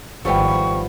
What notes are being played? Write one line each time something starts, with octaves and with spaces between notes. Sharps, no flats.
G#1 F3 G3 B3 A4 G5 C#6